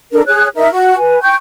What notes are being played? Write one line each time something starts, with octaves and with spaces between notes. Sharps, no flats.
D4 A4 A#4
G#4 C#5 F#6
D#4 A#4 E5
F#4
B4 G#5
G5 C#6 G6